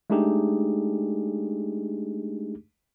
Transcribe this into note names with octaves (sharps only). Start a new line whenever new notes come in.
G#3 A3 D4 D#4 G4 G#4